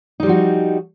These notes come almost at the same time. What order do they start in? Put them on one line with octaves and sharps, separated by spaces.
D#4 G3 F3 F#4